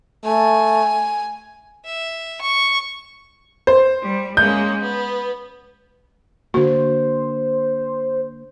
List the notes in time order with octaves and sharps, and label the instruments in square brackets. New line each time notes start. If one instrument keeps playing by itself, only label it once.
[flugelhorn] A3 [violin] G#5
[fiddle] E5
C#6
[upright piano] C5
[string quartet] G3
[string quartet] G#3 A#3 C#4 [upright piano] G6
[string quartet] B3
[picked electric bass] D3 A#3 [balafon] F#4 [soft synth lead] C5